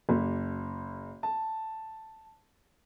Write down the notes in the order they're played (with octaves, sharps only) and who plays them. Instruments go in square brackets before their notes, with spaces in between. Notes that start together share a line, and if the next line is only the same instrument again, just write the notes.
[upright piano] F#1
A5